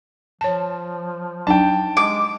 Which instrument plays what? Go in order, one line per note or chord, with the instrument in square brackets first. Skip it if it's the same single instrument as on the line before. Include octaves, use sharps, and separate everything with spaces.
[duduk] F3 [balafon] C#5 A5
[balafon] F#3 D4 D#4 [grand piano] G5 A5
[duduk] G#3 [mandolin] D6